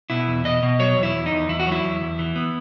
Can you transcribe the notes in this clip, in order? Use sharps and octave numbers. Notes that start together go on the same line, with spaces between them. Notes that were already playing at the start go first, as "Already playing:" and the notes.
B2 E4
E2
B2 D#5
B2
F#3 C#5
E2
E4
E2
D#4
E2
E2 E4
F#4
F#3
E4
E2
E2
E3
B3